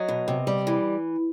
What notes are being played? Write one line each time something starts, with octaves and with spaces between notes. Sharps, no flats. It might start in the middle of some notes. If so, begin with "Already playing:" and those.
Already playing: F#3 D#5
B2
C3
G3
E3